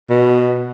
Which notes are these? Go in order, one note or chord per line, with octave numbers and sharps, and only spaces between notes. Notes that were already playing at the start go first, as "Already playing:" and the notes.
B2